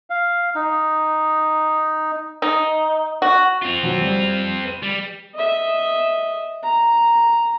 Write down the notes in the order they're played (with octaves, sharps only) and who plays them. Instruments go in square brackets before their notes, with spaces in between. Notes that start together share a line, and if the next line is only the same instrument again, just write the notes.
[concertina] F5
D#4
[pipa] D#4
F#4
[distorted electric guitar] C4 F4
[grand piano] B2 F#3
G3
B4 D#7
[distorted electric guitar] G3
[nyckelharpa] D#5 E5
A#5